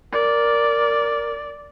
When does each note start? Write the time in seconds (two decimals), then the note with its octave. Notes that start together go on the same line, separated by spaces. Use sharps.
0.13 A#4 D5